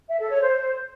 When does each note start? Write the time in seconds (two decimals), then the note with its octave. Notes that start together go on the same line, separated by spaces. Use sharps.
0.09 E5
0.20 A4
0.31 C#5
0.42 C5